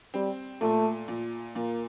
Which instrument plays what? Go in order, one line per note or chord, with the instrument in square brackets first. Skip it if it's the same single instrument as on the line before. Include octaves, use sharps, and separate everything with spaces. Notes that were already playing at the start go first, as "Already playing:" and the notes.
[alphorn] G3 [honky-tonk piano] C4
[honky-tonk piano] A#2 [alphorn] A3
[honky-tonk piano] A#2
[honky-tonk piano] A#2 [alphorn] A#3